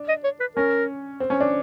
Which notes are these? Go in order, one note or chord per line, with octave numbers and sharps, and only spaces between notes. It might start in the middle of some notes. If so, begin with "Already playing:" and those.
Already playing: D4
D#5
C#5
B4
C#4 A#4
C4
C#4
D4